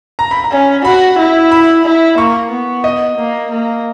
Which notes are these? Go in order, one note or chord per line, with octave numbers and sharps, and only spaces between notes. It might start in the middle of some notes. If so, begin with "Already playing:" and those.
A#5
B5
A#5
C#4
F#4 B5
E4
B5
E4
A#3 C#6
B3
D#5
A#3
A#3